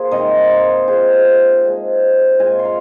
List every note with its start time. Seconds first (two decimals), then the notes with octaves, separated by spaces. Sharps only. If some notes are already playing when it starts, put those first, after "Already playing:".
Already playing: A#3 F4 G#4 C5
0.11 C3 G#3 C4 D#4 A#4 D#5
0.88 F3 C4 F4 G#4 C5
1.64 F3 G#3 C4
2.39 A#2 G#3 F4 G#5 C6
2.59 C6
2.65 F5 A#5